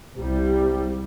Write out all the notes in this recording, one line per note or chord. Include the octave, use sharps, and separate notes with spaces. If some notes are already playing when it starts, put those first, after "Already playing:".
C2 C3 G3